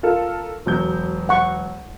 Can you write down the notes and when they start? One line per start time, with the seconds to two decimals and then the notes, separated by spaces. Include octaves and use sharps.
0.03 F4 A4 A#4
0.66 E1 F#3 G6
1.29 F#5 C#6